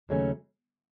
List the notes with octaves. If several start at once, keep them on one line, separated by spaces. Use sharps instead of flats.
D#2 C#3 F#3 A3 C#4